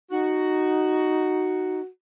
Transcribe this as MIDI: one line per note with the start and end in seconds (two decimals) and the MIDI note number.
0.11 1.81 63
0.11 1.86 66